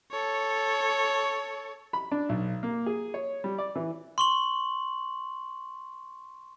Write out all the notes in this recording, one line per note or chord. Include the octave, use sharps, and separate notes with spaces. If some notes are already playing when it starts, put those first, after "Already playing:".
A4 C#5
B5
D4
B1
A#3
G#4
C#5
G3
D5
E3
C6 C#6 F#7